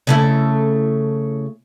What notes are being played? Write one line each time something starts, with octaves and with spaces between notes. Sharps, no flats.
C#3 A3 E4